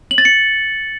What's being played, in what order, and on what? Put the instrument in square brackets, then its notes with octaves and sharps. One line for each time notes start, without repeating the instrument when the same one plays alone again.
[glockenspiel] F#7
A6
C#7